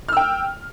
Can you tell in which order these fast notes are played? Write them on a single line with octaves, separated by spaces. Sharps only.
F6 E6 G5